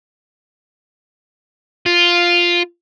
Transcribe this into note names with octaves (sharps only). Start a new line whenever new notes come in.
F4